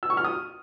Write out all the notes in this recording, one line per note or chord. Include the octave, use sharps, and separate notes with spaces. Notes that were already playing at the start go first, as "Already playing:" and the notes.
E6
C#6
F6
D#6